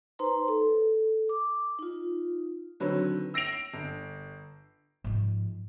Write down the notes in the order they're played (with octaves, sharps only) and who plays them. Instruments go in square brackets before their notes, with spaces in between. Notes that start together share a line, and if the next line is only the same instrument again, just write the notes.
[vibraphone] D#4 B4 C5 A#5 C6
A4
D6
D#4 F4
[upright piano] D3 D#3 F#3 C4 B4 C#5
E6 A#6 C7 D7 F7
G1
[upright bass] G#2 F3